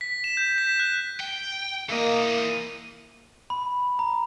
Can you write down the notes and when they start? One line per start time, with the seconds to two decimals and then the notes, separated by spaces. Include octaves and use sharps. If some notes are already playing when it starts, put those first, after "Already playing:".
0.01 B6
0.24 E7
0.37 G6
0.58 B6
0.80 F#6
1.20 G5
1.89 E3 A#3 D#5
3.50 B5
3.99 A#5